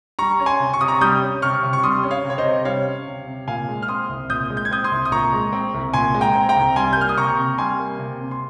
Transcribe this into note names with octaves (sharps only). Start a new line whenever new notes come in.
G3 A#5 C#6
C#4
G#5 C6
C3
C#6
C3 D#6
A#5 C#6
G3 D#6 G6
C#4
C3 C#6 F6
C3
C#6
G3 C6 D#6
C#4
C#5 F5
C3
C#5
C5 D#5
C3
G3 C#5 F5
C#4
C3
C3
A#2 F5 G#5
G#3
F6
C4 C6 D#6
C2
A#2 D#6 G6
G#3
G6
G#6
C4 D#6 G6
C6 D#6
C2
D#6
A#2 A#5 C#6
G#3
C4
C2
A#2 G#5 C6
G#3
G5 A#5
C4
G5 A#5
C2
G3 G#5 C6
G6
A#3 F6
D#6
C3 A#5 C#6
C3
G3 G#5 C6
A#3
C3
C3
C6